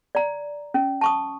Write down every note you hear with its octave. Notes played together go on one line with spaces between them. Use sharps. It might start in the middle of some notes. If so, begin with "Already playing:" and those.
D5 A#5
C#4
A5 C#6 D#6